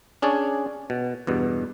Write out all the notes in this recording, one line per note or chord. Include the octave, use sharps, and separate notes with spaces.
C#4 D4 G#4 C#5 D5
B2
E2 G2 B2